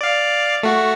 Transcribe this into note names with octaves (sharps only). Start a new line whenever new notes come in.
D5 F5
A3 F#4